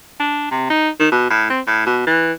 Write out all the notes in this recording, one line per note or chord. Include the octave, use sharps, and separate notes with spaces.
D4
C3
D#4
D#3
B2
A2
C4
A2
B2
E3